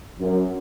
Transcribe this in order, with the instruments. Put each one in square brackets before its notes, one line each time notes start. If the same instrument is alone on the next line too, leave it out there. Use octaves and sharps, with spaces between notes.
[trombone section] F#2